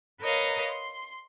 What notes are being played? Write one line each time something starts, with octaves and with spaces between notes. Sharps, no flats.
A#4 B4 C#5 D#5 F5 A#5
C6